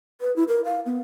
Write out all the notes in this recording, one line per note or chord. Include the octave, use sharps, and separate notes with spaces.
B4
E4
A#4
F5
B3